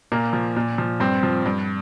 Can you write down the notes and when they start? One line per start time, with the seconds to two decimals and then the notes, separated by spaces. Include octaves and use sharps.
0.12 A#2 A#3
0.33 F3
0.56 A#2
0.78 F3
1.00 G2 C4
1.23 F3
1.46 G2